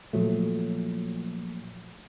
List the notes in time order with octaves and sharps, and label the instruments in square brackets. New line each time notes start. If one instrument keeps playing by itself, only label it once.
[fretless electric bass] A#2 F3 F#3 A3